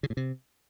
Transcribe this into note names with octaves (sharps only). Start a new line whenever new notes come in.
C#3
A2
C3